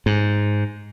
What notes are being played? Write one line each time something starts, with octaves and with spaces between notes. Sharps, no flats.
G#2